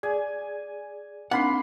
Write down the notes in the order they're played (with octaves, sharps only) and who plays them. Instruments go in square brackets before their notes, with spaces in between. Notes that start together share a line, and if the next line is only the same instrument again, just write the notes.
[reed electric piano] G#4 D5 [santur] G#5
[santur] A#3 B5 C6 [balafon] C4 D4 D#4 [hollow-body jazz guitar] F#5